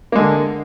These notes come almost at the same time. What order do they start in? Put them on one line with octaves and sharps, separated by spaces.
A#3 G#3 D3